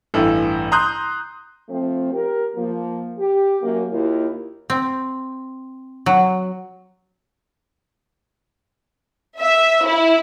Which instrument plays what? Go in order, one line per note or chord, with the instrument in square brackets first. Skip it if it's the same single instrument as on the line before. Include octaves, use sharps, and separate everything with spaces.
[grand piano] A1 G2 E3 A4 E6
A#5 C6 D#6 F#6 G6
[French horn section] F3 A3 C4
G4 A#4
F3 A#3
G4
F#2 A#3
D#2 A#3 E4 F4
[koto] C4
F#3
[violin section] E5
E4